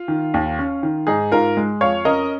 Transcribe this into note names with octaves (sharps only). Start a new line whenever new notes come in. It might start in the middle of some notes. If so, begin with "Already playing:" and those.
Already playing: F4
D#3
D#2
C#4
D#3
G#2 D#4 G#4
G#2 F4 A#4
G#3
F2 C#5 F5
C#4 A#4 D#5